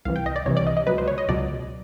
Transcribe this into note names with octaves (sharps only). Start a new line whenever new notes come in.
C2 C3 E3 F5
G5
D#5
D5
C2 C3 E3 C#5
D5
D#5
D#5
C#2 B2 F#3 B4
C5
C#5
D#5
C#2 B2 F#3 D5